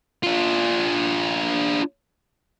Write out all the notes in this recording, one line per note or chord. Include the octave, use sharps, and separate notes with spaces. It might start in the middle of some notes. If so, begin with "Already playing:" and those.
D4 F4